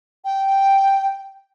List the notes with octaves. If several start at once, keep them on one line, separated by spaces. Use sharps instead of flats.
G5